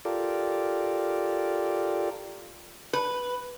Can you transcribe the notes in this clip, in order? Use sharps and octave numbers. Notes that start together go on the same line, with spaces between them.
F4 G4 A4 A#4 D5
B4